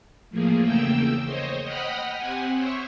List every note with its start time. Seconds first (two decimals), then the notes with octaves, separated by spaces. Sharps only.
0.30 A2 F3 A#3 G#4
0.62 E2 C#3 A3 A#3 G5 E6
1.25 C5 C#5 D#5
1.64 D#5 F#5 G5 B5 D#6 F6
2.18 C4 G4 F#5 G#5
2.54 C5 C#5 E5 C#6